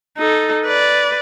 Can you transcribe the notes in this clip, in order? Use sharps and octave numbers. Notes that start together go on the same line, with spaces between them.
D#4 A4
B4 D5